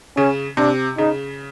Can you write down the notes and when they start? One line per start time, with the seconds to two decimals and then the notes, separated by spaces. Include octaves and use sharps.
0.17 C#3 C#4
0.57 C3 D4
0.98 C#3 D#4